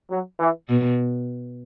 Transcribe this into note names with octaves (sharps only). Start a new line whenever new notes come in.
F#3
E3
B2